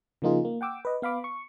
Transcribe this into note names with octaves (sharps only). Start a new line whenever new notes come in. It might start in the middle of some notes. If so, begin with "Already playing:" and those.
C#3 F3 A#3 D#4 F4 G#4
A#3
F#5 G5 D6 E6
B4 D#5
B3 F5 B5 D6
C#6